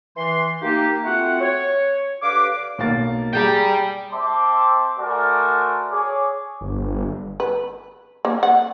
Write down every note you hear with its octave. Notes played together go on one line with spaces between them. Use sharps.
E3 C6
A#3 D#4 G4
A3 C4 F4 F#4 F#5
C#5
D3 G4 B4 F5 D6
B1 A#3 A6
G4 G#4 D5 G5 A#5
C4 E5 A5 C6 D6
A3 F#4 A#4 C5 D5 G#5
G#4 C#5 D6
G1
B4
A#3
F#5